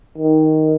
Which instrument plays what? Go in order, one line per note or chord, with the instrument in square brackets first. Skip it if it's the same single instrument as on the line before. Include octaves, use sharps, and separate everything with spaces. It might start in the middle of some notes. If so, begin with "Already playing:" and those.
[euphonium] D#3